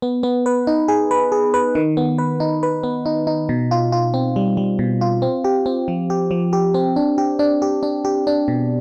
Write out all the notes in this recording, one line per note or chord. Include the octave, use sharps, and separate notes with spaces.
B3
B3
B4
D#4
G#4
B4
G#4
B4
D#3
B3
B4
D#4
B4
B3
D#4
D#4
B2
F4
F4
C4
G3
G3
B2
F4
C4
G4
C4
F3
G4
F3
G4
C4
D4
G4
D4
G4
D4
G4
D4
B2